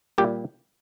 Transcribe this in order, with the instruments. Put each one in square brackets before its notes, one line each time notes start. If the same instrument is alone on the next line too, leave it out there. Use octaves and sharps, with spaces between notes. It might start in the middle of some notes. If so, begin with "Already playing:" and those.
[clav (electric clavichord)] A#2 G3 G4